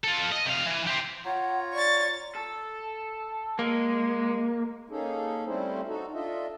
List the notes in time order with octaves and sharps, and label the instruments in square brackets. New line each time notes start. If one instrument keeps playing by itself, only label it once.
[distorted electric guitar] F4 A4
D#5
C3 F5
E3
G4 C5
[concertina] F4 C#5 A#5 [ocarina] F#5
[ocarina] D5 [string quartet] C#6 A6
[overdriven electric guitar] A4
[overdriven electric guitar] G#3 [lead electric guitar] A#3
[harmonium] A#3 C#4 D#4 G#4 A4
G3 A3 C4 C#4 E4 C5
D#4 F#4 A4
D4 F4 A4 D#5 E5